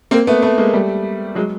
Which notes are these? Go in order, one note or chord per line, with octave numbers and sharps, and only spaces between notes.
A#3 C4
A3 B3
A3 B3
G#3 A#3
G3 A3
F#3 G#3